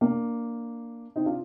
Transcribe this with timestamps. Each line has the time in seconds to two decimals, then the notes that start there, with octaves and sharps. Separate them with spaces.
0.01 A#3 D4
1.16 C4 D#4
1.26 D4 F4